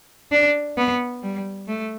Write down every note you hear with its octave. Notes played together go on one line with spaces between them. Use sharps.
D4
B3
G3
A3